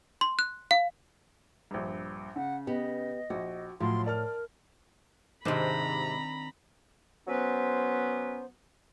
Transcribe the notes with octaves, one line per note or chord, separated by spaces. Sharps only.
C6
F#6
F5
A#1 G2
C#3 F#5
B3 G4 D#5
A#1 F#4
A2 F3 F#3 F4 C6
A#4 D5 A5 F6
G#2 C3 D#3 C4 D4 A#5 B5
F#3 B3 C#4 B4 C5